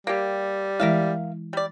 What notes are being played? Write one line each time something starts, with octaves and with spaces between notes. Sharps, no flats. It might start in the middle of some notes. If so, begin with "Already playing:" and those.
G3 A#3 G4
E3 G#3 E4 A#4 E5 F5
G3 D5